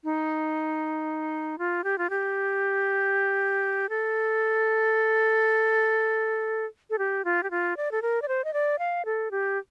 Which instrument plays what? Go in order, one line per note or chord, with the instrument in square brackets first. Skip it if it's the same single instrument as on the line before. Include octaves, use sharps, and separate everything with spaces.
[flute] D#4
F4
G4
F4
G4
A4
A4
G4
F4
G4
F4
D5
A4
A#4
D5
C5
D#5
D5
F5
A4
G4